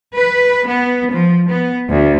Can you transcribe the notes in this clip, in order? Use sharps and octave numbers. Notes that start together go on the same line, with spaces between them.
B4
B3
F3
B3
D2